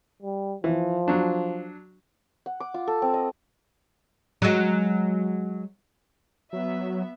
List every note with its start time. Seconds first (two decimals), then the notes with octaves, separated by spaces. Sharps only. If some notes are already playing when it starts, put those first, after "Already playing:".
0.23 G3
0.64 E3 F3
1.08 F#3 D4
2.46 F#5
2.60 D6
2.74 F4
2.87 A4
3.02 C4
3.14 D#5
4.42 F#3 G#3
6.53 F#3 B3 E5